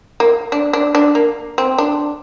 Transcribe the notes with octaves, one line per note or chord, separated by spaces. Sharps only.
A#3
D4
D4
D4
A#3
C4
D4